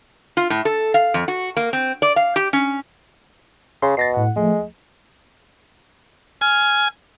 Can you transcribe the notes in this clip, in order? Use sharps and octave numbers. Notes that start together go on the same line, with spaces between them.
F4
A2
A4
F5
F2
F#4
A#3
C4
D5
F5
G4
C#4
C#3 C6
B2 A6 A#6 C7
A2 F#5
F3 G#3 A3
G#5 F6